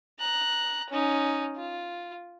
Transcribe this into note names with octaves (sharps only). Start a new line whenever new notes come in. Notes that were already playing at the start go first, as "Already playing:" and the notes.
A#5 F#6
C#4 D#4
F4